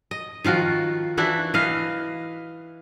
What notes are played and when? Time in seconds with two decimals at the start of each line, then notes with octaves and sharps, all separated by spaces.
0.11 D#5
0.44 D#3 F3 F4 F#4
1.17 E3 D4 E4 F#4
1.54 E3 D#5 F5